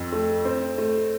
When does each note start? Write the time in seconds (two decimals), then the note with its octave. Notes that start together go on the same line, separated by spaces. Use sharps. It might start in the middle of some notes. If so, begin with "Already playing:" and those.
Already playing: F2
0.13 A3
0.45 C4
0.78 A3